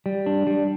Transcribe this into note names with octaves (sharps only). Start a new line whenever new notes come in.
G3
D4
G3